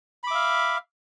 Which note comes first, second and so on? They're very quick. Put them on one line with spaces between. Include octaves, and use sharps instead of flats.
B5 D6 E5 F5